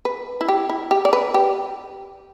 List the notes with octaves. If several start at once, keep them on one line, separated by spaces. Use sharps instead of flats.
B4
E4
G4
E4
G4
D5
B4
G4